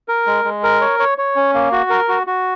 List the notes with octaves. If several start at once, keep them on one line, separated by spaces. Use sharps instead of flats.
A#4
G#3
G#3
A#4
C#5
C#5
C#5
C#4
A#3
F#4
A#4
F#4
F#4